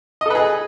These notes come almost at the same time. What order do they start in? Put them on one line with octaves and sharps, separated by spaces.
D#5 A4 B4 G#4